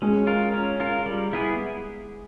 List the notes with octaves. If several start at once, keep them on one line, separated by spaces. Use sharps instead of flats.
G#3 C#4
F4 A#4
C#4
F4 A#4
G3
B3 E4 G#4